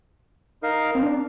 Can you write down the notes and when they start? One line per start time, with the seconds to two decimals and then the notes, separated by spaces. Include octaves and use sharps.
0.63 D#4 A#4 F5
0.95 C4
1.03 D4